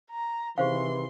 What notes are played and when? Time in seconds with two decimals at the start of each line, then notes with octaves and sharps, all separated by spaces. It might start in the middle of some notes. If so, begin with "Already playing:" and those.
0.10 A#5
0.58 C3 D#3 E3 G#4 C5 F5 C6